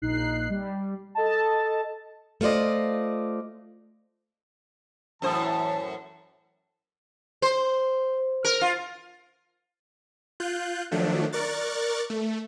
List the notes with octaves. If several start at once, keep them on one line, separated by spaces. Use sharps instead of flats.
A#1 D#4 F#6 C7
G3
A4 D#5 A5
A3 F4 C5 D5 D#5
F#2 A2 E3 C5 A5
C5
A#4
F4
F4 F#6 G6
D#3 F3 F#3 A3 D4
A#4 D5 C#6 F#6 A6
A3